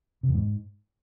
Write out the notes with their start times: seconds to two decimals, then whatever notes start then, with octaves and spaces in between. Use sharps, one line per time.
0.23 C3
0.29 E2
0.35 G#2